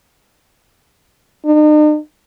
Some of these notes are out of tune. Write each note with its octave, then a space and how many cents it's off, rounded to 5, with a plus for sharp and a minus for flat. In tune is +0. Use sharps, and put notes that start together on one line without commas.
D#4 -45